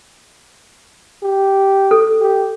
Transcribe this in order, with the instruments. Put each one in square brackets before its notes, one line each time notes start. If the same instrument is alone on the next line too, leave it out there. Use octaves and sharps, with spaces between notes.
[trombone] G4
[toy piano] A4
[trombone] G4